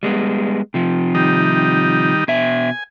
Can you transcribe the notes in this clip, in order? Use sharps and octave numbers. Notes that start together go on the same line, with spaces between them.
G3 G#3 B3
C3 F3
D#3 G3 D#4
B2 E5 G#5